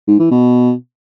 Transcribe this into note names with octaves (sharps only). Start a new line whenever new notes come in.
G#2
E3
B2